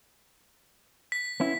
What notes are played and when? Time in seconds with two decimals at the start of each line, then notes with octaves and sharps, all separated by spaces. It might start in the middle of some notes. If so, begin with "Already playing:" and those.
1.12 B6
1.40 B3 C#4 E4